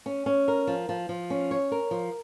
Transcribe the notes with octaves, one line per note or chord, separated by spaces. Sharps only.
C#4
C#4
A#4
F3
F3
F3
C#4
C#5
A#4
F3